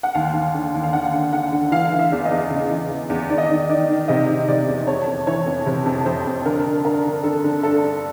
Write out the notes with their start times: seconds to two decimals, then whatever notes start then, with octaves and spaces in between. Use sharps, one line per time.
0.03 F#5
0.15 D#2 F5
0.34 D#2
0.54 D3
0.74 D#2
0.84 F5
0.93 D3 F#5
1.13 D3
1.33 D3 F#5
1.52 D3
1.72 E3 F5
1.92 E3
1.99 E5
2.12 E2
2.25 D#5
2.31 E2
2.50 C#3
2.70 E3
2.91 C#3
3.10 E2
3.29 D#3 D5
3.38 D#5
3.45 D5
3.50 D#3
3.69 D#3 D5
3.90 D#3
4.08 C3 D#5
4.29 D#3
4.48 C3 D5
4.68 E2
4.87 F2 C#5
5.07 F2
5.27 E3 C#5
5.46 F2
5.66 C3
5.86 F2
6.05 F2 C5
6.26 F2
6.45 D3 A#4
6.65 D3
6.84 G2 A#4
7.05 D3
7.24 D3 A4
7.44 D3
7.63 G2 A4
7.84 G2